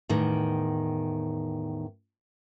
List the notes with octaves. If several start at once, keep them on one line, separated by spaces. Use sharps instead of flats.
E2 A2 D#3